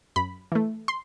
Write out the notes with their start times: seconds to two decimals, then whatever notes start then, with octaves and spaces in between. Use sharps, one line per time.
0.16 F#2 B5
0.52 E3 A3
0.88 C6